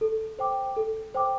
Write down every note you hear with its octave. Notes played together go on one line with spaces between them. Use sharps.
A4
C5 G5 D6
A4
C5 G5 D6